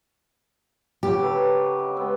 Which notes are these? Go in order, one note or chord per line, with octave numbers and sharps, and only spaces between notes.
C#3 F#4 G4
F#3 A4 B4
D#5
G#3 B3 C4